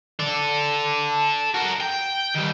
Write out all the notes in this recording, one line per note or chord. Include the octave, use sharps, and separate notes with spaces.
A4 D5
F#4 A#4
G5
D#3 G3